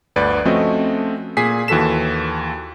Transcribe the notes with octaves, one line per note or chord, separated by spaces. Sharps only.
G1 D2 B4 D5
F3 A3 C4 C#4 F#4 D#5
A#2 G#4 G#5 B6 C7
D#2 E3 F#4 A4 B6 E7